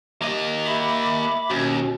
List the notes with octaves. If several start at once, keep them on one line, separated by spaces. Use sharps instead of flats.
A#3 G4 D#5
E5 B5 D6
D#2 B2 C#4